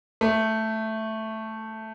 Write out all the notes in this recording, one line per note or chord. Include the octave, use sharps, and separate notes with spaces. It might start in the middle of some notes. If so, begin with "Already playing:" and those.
A3